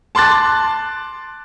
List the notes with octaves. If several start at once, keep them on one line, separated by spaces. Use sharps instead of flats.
A5 C6 D6 F#6 A6